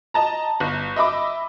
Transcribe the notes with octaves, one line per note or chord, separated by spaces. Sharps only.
D#5 A5 A#5
G1
D#5 E5 B5 D6